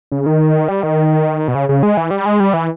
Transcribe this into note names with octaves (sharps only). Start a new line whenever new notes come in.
C#3
D#3
G3
D#3
B2
C#3
C#3
G#3
E3
G3
G#3
G3
E3